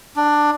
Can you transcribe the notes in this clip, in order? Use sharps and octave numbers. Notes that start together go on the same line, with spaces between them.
D4